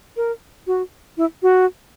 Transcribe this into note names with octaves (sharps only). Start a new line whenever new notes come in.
A#4
F#4
E4
F#4